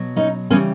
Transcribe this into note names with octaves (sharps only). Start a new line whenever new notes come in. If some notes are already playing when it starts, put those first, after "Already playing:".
Already playing: B2 F#3
C#4 D#4
C#3 E3 G3 B3 C#4